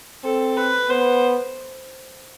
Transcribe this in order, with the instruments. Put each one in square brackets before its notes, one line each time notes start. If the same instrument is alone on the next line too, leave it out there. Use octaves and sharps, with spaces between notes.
[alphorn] C4 [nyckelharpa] A4
[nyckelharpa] B4
[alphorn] B3 [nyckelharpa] C5